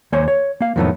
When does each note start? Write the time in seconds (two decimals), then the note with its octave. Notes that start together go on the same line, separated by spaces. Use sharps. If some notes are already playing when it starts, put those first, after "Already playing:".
0.12 D#2 A#3 C5 C#5 G#5
0.28 C#5
0.61 A#3 F5
0.76 F2 A2 D#3 F#3 A3 B3